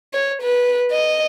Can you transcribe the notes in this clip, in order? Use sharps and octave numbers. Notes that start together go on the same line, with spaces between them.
C#5
B4
D#5